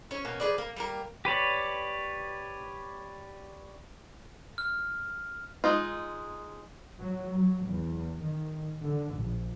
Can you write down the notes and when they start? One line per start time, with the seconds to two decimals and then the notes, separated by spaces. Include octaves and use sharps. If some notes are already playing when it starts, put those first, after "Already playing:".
0.11 C#4 C#5
0.25 B2 A#3 C#4
0.40 F3 G#4 B4 D5
0.58 A#3
0.76 G3 A#3 A#4
1.25 G4 B4 C#5 D5
4.58 F6
5.64 G#3 D#4 F4
7.00 F#3
7.35 F#3
7.66 E2
8.23 D#3
8.84 D3
9.17 A#1